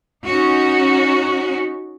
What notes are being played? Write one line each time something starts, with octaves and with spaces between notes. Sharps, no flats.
C#4 D#4 F#4